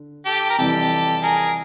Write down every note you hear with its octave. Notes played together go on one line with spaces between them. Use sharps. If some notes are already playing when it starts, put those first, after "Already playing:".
Already playing: D3
G4 A4
A#4
F2 C3 E3 G3 G4 A4
G#4 A#4